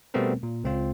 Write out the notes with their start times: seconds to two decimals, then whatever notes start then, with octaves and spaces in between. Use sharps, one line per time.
0.14 B2 G3 A3 B3 C4 A#4
0.43 A#2
0.64 C#2 C4 F4